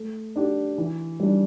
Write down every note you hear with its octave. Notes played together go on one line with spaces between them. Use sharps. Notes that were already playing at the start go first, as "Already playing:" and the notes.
Already playing: A3
D4 G4
E3
G3 D4